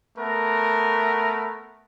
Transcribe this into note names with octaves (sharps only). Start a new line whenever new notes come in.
A3 B3 A#4